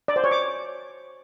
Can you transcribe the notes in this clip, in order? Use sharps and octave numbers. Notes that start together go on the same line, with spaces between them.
D5
C5
C#5
D6